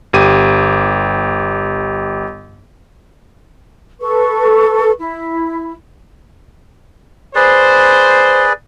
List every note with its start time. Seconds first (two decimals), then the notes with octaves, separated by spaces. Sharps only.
0.13 G1 G4 D#7
4.01 A4 B4 C#6
5.00 E4
7.35 G#4 B4 C5 D5